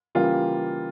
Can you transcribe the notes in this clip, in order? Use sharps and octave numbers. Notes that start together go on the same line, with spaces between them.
C#3 E3 G3 A#3 F4